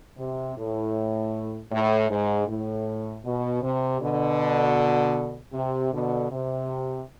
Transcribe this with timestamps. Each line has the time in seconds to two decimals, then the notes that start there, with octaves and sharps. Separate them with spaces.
0.17 C3
0.56 A2
1.71 A2
2.09 G#2
2.47 A2
3.24 B2
3.62 C3
4.00 B2 D3
5.53 C3
5.92 B2 D3
6.30 C3